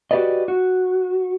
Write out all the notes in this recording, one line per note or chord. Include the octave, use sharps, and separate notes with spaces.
F#4 G4 A#4 B4 D5 D#5
F#4